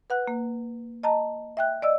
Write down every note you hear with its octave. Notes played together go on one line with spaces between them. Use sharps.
B4 F#5 F#6
A#3
D#5 A5 A#5
E5 G5 F#6
D5 D#5 E6